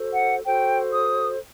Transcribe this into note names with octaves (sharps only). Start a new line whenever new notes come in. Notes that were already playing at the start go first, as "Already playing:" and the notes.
Already playing: F#4 A4 C5
F#5
F#4 A4 C5 G5
D#6